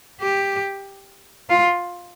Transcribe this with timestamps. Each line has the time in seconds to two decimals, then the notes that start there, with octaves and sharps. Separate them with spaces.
0.21 G4
1.50 F4